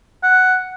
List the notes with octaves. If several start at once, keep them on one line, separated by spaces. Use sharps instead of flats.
F#5